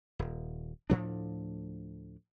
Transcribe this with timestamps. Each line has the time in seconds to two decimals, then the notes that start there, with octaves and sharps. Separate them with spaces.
0.19 D#1
0.90 D2 A2 F3 D4